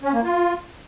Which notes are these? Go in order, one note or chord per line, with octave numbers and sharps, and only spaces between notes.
C#4
A#3
F4